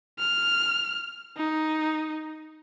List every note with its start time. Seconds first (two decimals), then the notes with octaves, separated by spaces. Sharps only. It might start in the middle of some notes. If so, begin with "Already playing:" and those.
0.19 F6
1.37 D#4